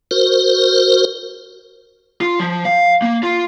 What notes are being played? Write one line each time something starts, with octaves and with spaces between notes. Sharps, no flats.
F#4 A#4 C5
F4
F3
F5
A#3
F4